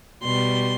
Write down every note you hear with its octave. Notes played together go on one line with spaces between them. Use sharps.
B2 G3 C6